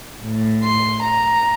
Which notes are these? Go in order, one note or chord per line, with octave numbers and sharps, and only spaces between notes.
A2
C6
A#5